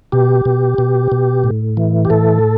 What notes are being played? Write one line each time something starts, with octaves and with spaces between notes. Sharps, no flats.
B2 G4
B2
B2
B2
A2
E3
G4
A2 A4